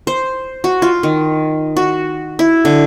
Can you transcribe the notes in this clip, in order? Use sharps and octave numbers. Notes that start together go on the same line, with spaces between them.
C5
F#4
F4
D#3
F#4
E4
D3